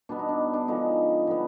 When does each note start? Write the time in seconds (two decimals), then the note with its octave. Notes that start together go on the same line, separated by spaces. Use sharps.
0.09 B2 G3 B3 D4
0.19 D#4
0.29 D4
0.54 D4
0.68 D3 F3 G#3 D#4
1.27 D3 G3 B3